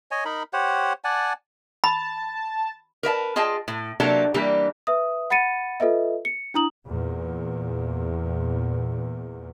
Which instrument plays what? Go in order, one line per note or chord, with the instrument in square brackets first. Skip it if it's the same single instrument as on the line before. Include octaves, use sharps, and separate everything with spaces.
[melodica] C#5 D#5 G#5
D#4 A#4 B5
G4 C5 C#5 F#5
D5 F#5 G#5 A5
[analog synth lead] A5 [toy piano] B5
[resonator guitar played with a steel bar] A#4 B4 E5 A5
F4 G#4 D#5 G5 A5
A2
C3 F#3 A#3 D4 G4 A4
E3 G3 A#3 D4 G4
[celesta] B4 E5 D#6
F#5 B5 A6 C#7 D#7
F4 A4 B4 D#5 E5
C#7
D4 E4 A#5 D#6 F#7
[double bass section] E2 A#2